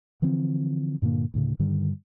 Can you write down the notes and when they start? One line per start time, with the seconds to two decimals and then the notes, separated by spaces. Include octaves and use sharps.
0.22 D3 E3 F3 C4
1.02 G2 A#2 D3 A#3
1.34 D2 A2 C#3
1.59 G2 D3 D#3 G3